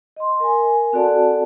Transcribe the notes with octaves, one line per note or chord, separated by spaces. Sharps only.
D#5 C6
A#4 G#5
C4 F#4 A4 D5 F#5 A5